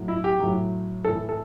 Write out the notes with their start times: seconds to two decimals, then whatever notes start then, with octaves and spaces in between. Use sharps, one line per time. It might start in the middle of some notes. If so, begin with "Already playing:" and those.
Already playing: A2 F#3
0.08 E4
0.24 G4
0.40 A2 F#3
1.04 A2 E3 A4
1.29 A4